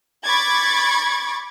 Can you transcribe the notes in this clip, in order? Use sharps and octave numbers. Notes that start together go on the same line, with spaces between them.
B5 C#6 D6 G#6 A6